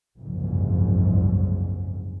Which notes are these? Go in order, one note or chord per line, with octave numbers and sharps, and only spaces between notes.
F#1 C2 F2 G#2